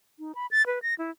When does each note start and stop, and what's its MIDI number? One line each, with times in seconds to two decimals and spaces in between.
0.19 0.35 63
0.35 0.46 83
0.51 0.65 93
0.66 0.79 71
0.83 0.94 94
0.99 1.11 64